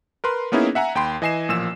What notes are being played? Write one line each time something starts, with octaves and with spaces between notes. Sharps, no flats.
A#4 B4 C6
A#3 B3 C#4 D#4 E4 G#4
E5 F#5 G#5 A#5
D#2 G5 B5 C6
E3 D#5 G#5 C7 E7
A1 A#2 F3 E6 E7